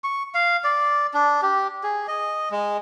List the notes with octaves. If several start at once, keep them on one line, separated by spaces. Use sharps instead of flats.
C#6
F5
D5
D4
G4
G#4
D#5
G#3